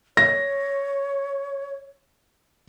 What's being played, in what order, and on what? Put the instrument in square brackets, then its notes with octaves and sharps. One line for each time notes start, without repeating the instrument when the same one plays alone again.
[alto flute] C#5 [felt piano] A#6